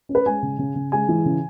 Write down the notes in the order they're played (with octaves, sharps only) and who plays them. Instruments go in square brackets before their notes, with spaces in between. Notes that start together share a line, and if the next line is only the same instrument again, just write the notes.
[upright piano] C#4
B4
G#3 G#5
C#3
C#3
C#3
G#3 G#5
E3
C#3